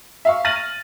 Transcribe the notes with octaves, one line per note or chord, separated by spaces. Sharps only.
E5 F5 C#6
F6 A6 A#6 D#7 F#7